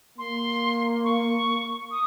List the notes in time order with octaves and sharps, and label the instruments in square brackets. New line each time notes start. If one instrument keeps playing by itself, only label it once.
[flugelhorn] A#3 [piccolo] C6
[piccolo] C#6
D#6